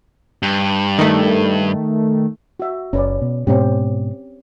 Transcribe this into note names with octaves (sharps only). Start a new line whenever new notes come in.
G2
D#3 A3
F#4 E5
F#1 C#4 B4 D5
B2
G#2 B2 C4 C#4 G4